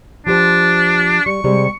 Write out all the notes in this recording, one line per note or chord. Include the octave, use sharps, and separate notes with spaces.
F3 D4 G4 C5
G3 C#6
C3 G3 G#3